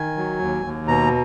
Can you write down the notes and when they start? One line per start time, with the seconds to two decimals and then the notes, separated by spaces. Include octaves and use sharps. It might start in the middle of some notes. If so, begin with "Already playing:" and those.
Already playing: D#3 G#5
0.17 F#3
0.41 D#2
0.65 D#2
0.87 B2 A#5